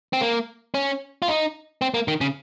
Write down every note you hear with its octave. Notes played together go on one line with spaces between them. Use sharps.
C4
A#3
C#4
F4
D#4
C4
A#3
D#3
C#3